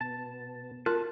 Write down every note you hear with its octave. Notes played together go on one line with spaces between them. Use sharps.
B2 B3 A5
F4 A#4 A5 F#6